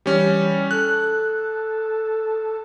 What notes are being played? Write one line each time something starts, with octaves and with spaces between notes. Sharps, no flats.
E3 G3 C#4
A4 F#6